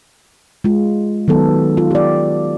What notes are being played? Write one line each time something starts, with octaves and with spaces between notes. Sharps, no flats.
G#3 F4
D#3 F#3 B3 A4
F4
G4 D5